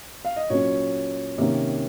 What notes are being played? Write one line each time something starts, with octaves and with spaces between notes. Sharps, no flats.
F5
D#5
A#2 F#3 C#4 C#5
C3 D#3 A#3 C#4